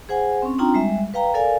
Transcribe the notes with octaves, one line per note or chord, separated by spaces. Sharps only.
G#4 C5 F#5 G#5
C4 C#4
C4 D4 D#4 F4 G5 A#5
G3 G#3 E5
B4 F5 G5 A#5
A4 A#4 D5 F5 G#5